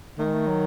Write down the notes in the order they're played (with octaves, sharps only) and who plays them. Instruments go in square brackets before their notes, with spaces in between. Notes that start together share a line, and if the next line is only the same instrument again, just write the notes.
[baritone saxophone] D#3 [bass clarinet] A3
[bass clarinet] G#3
A3
F#3